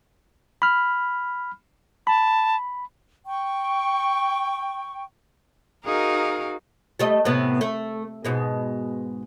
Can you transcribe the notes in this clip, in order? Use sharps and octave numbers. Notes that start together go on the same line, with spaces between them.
B5 F6
A5 B5
G5 C#6
D#4 F#4 G#4 A#4 F5
G3 A3 D#5
A2 C3 B3
A3
G#2 B2 G#3